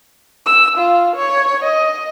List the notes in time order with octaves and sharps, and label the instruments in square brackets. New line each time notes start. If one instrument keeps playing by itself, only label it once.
[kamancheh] E6
F4
C#5
D#5